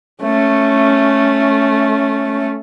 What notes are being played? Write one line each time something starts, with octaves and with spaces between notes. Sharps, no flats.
A3 C#4